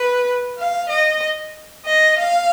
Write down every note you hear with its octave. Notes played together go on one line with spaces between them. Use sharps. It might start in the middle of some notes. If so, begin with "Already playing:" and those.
Already playing: B4
F5
D#5
D#5
F5